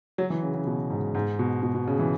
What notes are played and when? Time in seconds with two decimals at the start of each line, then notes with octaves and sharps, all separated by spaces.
0.18 F#3
0.30 E3
0.43 C#3
0.54 C#3
0.66 B2
0.90 G#2
1.15 G#2
1.39 B2
1.63 B2
1.75 B2
1.88 C#3
1.99 E3